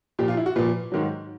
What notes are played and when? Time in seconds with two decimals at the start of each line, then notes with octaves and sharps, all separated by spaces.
0.19 A#2 F3 G4
0.28 F4
0.37 E4
0.46 F#4
0.56 A#2 F3 B4
0.92 G#2 D#3 F#3